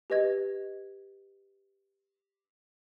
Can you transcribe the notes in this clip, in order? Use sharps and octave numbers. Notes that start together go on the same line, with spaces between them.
G4 B4 D#5 G#6